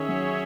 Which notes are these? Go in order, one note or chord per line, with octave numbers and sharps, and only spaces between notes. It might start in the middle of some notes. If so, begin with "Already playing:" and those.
Already playing: D#3 C#4 G#4 C#5 E5
F#3